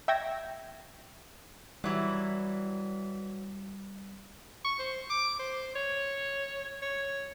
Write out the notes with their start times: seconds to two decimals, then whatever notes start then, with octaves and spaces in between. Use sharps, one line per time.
0.08 E5 G5 C#6 G#6 A#6
1.84 E3 F#3 G3
4.65 C#6
4.79 C5
5.10 D6
5.39 C5
5.75 C#5
6.82 C#5